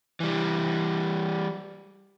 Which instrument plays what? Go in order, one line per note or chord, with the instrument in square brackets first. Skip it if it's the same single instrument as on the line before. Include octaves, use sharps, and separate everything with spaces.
[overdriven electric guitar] E3 G3